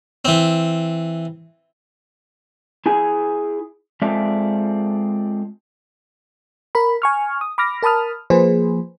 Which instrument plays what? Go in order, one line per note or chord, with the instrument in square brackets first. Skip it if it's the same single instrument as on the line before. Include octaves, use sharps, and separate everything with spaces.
[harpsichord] E3 C4
[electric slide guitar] E4 G#4 G#5
G#3 C4 F4 A4 D5 E5
[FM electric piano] A#4 B5
G#5 C#6 F6
D#6
B5 D6 F6 A#6
A#4 A5 B5 D#6 F6
F3 A#3 G#4 B4 C5